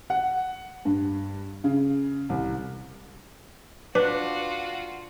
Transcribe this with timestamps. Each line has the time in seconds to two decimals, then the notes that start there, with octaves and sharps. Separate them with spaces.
0.10 F#5
0.85 G2
1.64 C#3
2.29 C2
3.95 D4 F4 F#4 B4